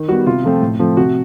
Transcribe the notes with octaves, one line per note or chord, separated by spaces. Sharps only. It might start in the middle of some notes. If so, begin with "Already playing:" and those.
Already playing: D#3
G3 B3 F#4
C3 F4
F3 A3 C4
A2
F3 A3 C4
C3 F#4